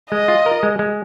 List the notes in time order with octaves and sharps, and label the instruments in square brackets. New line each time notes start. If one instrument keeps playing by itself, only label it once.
[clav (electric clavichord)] G#3 [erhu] D#5
[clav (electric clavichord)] F4
A#4
G#3
G#3